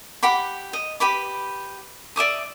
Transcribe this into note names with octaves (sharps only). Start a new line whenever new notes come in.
G4 F#5 B5 D6
D#5
G4 B4 B5 D6
D5 E5 D6 D#6